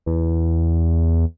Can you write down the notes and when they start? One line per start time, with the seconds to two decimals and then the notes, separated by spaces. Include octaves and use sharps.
0.06 E2